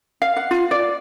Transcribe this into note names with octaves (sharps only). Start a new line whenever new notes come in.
F5
F#5
F4
D5